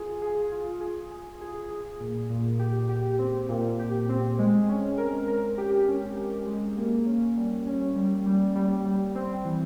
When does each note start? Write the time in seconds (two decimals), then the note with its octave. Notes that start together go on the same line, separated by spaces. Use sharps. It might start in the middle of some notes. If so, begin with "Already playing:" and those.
Already playing: F4 G#4
0.22 G#4
0.52 F4
0.81 G#4
1.11 G#4
1.41 G#4
1.70 G#4
2.00 A#2
2.30 A#2
2.59 G4
2.89 G4
3.19 C4
3.49 A#2
3.79 G4
4.09 C4
4.39 G#3
4.69 C#4
4.98 A#4
5.28 A#4
5.58 G4
5.88 C#4
6.17 G4
6.47 G#3
6.77 A#3
7.06 C#4
7.37 G3
7.66 C#4
7.96 G3
8.26 G3
8.55 G3
8.85 G3
9.15 C4
9.45 E3